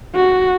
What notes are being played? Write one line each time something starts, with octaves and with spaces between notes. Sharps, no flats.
F#4